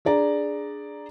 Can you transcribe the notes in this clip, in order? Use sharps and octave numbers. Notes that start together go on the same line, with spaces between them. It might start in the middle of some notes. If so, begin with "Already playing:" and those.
D4 G#4 D5 A#5